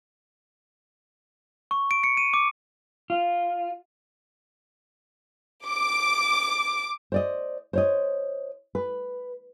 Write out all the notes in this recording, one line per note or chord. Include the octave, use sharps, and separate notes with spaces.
C#6
D7
C#7
D#7
D6
F4
D6
C5 D5 D#5
C5 C#5 D#5
B4